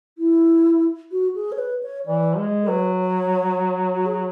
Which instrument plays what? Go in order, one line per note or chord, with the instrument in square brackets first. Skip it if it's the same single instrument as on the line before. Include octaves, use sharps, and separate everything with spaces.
[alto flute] E4
F#4
G#4
C#5
B4
C#5
[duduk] E3 [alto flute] D5
[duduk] G#3
[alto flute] A4
[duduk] F#3 [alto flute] B4
[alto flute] C#5
F#4
G#4